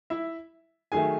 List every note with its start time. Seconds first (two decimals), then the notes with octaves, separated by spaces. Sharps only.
0.10 E4 E5
0.92 D#3 F#3 A3 G#4 G#5